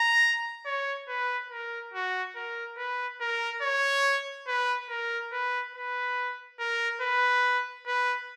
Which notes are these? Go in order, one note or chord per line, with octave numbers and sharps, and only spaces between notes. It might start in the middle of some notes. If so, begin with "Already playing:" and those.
Already playing: A#5
C#5
B4
A#4
F#4
A#4
B4
A#4
C#5
B4
A#4
B4
B4
A#4
B4
B4